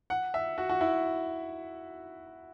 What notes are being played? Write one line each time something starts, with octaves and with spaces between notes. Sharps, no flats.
F#5
E5
F#4
F#4
E4